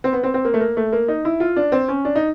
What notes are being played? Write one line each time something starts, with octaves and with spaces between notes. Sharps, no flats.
C4
B3
C4
C4
A#3
A3
A#3
A3
A#3
D#4
E4
F4
D4
C4
C#4
D4
D#4